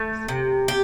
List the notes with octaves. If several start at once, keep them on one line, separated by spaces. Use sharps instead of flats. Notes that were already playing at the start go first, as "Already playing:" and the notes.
Already playing: A3
C3
G4